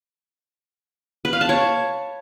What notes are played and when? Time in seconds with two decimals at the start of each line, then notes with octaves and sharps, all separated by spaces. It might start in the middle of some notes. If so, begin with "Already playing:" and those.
1.25 B4
1.33 F5
1.41 A5
1.49 C#5